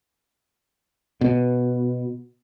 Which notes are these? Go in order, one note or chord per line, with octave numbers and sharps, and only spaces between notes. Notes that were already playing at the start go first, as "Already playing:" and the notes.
B2